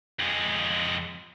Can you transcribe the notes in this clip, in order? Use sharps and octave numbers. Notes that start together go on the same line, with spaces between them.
F2 G#3